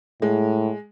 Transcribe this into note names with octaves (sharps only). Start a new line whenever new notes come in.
A2 G#3